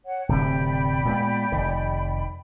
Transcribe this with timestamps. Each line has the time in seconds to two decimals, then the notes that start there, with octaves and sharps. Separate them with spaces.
0.04 C#5 F#5
0.29 D1 C3 D5 G5 B5
1.05 A#2 G#3 B3
1.52 F1 D#3